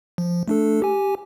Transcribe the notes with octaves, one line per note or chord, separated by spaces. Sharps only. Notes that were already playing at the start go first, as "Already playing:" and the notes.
F3
A3 D4 A4
G4 G#5